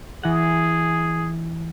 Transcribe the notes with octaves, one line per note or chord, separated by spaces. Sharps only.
E3 G#4 F#5